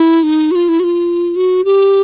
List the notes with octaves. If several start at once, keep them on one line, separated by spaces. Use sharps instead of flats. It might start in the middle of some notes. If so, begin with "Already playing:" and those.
Already playing: E4
D#4
F#4
F4
E4
F#4
F4
F#4
G4